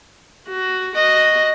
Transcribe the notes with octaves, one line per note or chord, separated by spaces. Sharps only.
F#4
F#4 D#5